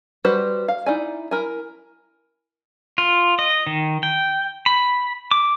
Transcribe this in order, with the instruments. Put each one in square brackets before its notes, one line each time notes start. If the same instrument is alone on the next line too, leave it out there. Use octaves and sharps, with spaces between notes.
[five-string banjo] G3 F#4 B4 C5
F5
D#4 E4 D5 G#5
E4 A#4 G#5
[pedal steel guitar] F4
D#5
D#3
G5
B5
D6